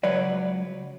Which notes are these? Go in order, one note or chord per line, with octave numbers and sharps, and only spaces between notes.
C#2 F#3 B4 C#5 D5